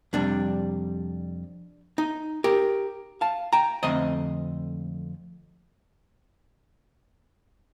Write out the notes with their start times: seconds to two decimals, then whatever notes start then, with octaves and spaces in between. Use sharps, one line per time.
0.13 F2 C3 G3 D4
1.98 D#4
2.44 G4 A#4
3.21 F5 A5
3.53 G5 A#5
3.83 F2 D3 A3 C4 C5 D#5